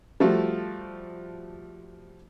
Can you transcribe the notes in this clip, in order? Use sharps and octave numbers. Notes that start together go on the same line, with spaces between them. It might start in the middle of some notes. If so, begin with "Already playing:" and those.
F3 G3 A3 F#4